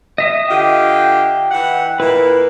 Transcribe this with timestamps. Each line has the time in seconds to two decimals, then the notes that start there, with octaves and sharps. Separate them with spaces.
0.18 D#5 E5 D#6
0.49 D3 F4 G4 G5
1.50 E3 F#5
2.00 A#2 E4 B4